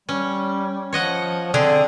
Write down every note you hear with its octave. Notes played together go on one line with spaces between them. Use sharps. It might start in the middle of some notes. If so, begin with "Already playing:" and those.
G3 C#4
F3 C#5 D#5 F#5
D3 C4 G#4